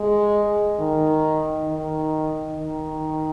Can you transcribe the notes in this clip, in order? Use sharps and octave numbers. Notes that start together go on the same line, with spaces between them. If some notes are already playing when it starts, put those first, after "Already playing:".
Already playing: G#3
D#3
D#3
D#3